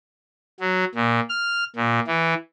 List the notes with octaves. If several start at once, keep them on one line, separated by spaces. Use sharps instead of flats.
F#3
A#2
F6
A#2
E3